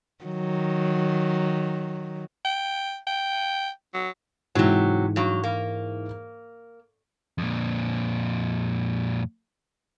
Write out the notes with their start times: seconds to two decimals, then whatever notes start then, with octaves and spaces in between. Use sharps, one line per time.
0.24 D#3 F#3
2.45 G5
3.07 G5
3.94 F#3
4.55 G#2 C3 E3 F#3
5.16 G2 F#3
5.43 A#3
7.38 F2 A#2